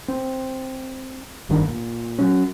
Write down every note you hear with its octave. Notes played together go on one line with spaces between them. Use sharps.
C4
F#1 G2 D#3 D4
A#2
F#3 C#4